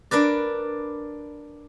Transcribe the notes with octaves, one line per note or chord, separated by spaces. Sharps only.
D4 A#4 B4 D5